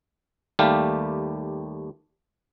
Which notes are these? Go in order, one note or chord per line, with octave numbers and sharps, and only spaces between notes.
D#2 G3 A3 G4 F5